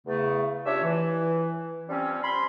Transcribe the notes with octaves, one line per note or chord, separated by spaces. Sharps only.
E2 C#3 A3
C#4 D4 F4 G4 C#5 E5
E3
F3 G3 C4 C#4
B5 C6